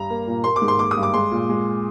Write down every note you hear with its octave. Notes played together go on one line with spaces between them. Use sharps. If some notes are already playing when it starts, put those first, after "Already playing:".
Already playing: G2 A#5
A#3
A#2
A#3 C6
D6
G#2
C6
A#3 D6
D#6
G2
D6
G#3 C6
A#2
G#3